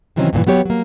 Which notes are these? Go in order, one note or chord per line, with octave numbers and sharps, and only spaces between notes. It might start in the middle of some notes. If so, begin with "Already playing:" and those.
C3 D#3 E3 F#3 C4 C#4
G2 A#2 D3 E3
F#3 B3 G4 C#5
F#3 A#3